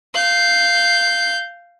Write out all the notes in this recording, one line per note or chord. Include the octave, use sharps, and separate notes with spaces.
F5 G6